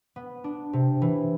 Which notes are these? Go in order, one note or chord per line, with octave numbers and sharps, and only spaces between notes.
B3
D4
C3
E3